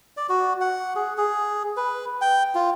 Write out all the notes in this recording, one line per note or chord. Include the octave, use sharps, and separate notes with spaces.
D5
F#4
F#5
G#4
G#4
B4
G5
F4